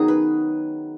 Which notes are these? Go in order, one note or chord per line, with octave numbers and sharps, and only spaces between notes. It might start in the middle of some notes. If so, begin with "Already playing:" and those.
Already playing: D#3 F#3 B3 C#4 D#4 F#4 G#4
B4